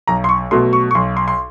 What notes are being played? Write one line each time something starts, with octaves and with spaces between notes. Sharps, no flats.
B1 A#5
C6
C#6
B2 F#3 A3 C6
C#6
C#6
B1 C6
C6
C6